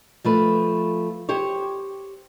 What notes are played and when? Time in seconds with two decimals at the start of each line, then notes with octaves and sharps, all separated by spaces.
0.24 F3 A3 B4
1.29 G4 C5 C#5